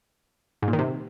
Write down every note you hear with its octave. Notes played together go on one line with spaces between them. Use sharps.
G#2
A#2
D#3
C3